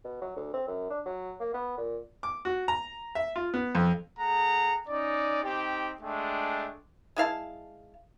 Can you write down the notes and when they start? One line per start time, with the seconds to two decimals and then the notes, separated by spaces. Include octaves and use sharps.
0.05 B2
0.22 F#3
0.36 D2
0.53 C4
0.67 F#2
0.90 D4
1.06 F#3
1.40 A#3
1.54 B3
1.77 A#2
2.23 D6
2.45 F#4
2.68 A#5
3.15 E5
3.36 F4
3.54 B3
3.75 F2
4.18 A3 G#4 F#5 A#5
4.88 C#4 D#4 D5
5.43 C4 D#4 G4
6.01 G#3 A3 D4 G5
7.16 G#3 E4 F5 A5